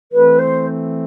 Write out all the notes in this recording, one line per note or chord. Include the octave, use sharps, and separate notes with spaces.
E3 A3 C4 B4
C5